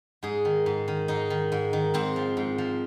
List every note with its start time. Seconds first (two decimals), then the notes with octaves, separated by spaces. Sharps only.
0.23 G#2 G#4
0.45 D#3
0.66 G#2
0.88 D#3
1.08 G#2 D#4
1.30 D#3
1.52 G#2
1.73 D#3
1.94 G#2 C4
2.16 F3
2.37 G#2
2.58 F3